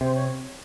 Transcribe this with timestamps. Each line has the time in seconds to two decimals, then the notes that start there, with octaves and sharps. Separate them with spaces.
0.01 C3 C5
0.15 C#5